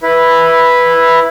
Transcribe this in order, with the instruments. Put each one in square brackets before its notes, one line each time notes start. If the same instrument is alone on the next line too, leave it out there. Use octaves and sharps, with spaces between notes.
[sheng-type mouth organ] E4 B4